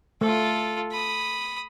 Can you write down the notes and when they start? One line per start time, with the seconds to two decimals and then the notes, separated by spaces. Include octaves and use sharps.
0.21 A3 F4 A4
0.91 B5 D#6